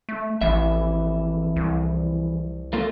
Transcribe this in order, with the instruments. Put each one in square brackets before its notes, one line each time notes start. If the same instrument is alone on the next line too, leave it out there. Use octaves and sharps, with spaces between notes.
[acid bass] A3
[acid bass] A1 [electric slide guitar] F2 E3 E5
[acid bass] C2
[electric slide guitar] A3 A#3 F4